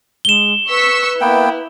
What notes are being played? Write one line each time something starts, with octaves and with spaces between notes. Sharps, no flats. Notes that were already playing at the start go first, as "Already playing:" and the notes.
G#3 E7 G7
B4 C#6 E6 B6
A#3 B3 E4 G5